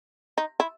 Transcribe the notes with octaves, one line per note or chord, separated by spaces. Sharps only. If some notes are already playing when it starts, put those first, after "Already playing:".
D#4
E4